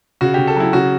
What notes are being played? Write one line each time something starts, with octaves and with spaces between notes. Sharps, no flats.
C#3 F#4
C#3 G4
A4
F#3 E4
C#3 F#4